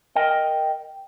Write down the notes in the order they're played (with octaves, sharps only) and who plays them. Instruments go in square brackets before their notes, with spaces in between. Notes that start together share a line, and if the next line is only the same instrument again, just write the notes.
[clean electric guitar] A#4 D#5 G5